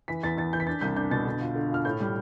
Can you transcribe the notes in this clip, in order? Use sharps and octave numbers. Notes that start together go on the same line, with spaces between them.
E3 B6
E2 A6
E2 A6
E3 G6
B6
D4 A6
C2 G6
D4 G6
B2 A6
D3
F4
D3
F4 F6
A2 G6
G3